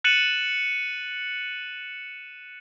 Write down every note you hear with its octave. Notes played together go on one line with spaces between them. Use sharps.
F#6 A6 C#7 D#7 E7 F#7